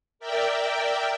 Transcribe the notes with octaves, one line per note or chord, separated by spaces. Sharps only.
A#4 D5 E5 G5